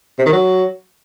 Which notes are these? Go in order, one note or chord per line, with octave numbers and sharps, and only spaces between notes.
C3
D#3
F#3